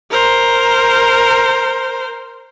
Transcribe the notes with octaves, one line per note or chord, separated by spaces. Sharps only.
A#4 C5